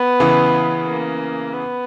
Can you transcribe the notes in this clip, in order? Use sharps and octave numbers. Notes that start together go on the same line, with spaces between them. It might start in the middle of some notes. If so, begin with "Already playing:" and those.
Already playing: B3
C#3 E3
A#3
B3